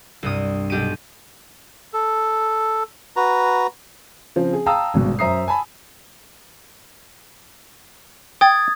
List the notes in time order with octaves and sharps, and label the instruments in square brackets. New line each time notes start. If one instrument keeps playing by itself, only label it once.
[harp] C2 G2 D#6
B1 G4 D7 D#7
[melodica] A4
F#4 B4 A#5
[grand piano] C#3 F3 C4
G#4
F5 G5 A5 A#5 D#6 E6
G#1 G2 B2
F#2 C5 E5 A#5 D#6 C7
G#5 A5 B5
[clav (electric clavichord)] G5 [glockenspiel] D#6 G#6 A6